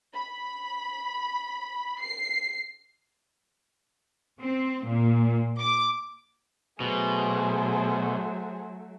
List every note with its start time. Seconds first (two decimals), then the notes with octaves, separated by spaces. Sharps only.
0.14 B5
2.01 C7
4.39 C4
4.85 A#2
5.59 D6
6.80 B2 F#3 A3 G#4 C5